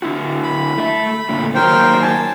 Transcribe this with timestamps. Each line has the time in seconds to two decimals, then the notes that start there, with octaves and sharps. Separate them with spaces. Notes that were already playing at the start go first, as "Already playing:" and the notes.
0.02 D3 E4 F#4
0.43 B5
0.78 A3 E5
1.29 A#2 D3 A3
1.55 D#3 F#3 A#3 A#4 C5 G5
2.02 G#5 A5